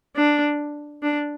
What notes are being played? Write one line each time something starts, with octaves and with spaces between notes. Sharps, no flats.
D4
D4